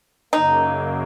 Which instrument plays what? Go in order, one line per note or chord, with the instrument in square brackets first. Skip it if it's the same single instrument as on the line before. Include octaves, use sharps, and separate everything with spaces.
[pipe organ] F#2 C#3 F#3 A#3 [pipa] D#4